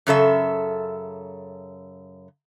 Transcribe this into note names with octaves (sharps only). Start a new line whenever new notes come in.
F#2 C#3 A4 E5